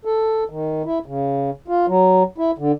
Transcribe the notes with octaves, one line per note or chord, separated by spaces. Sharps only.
A4
D#3
E4
C#3
F4
F#3
E4
D3